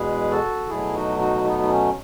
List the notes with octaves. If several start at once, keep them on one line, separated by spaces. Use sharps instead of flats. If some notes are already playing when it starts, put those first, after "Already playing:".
Already playing: E2 B2 G#3 G#4 B4
F#4 A4
B2 F#3 A3 E4 G#4
D#4 F#4
D#4 F#4
B3 D#4
D#4
C#4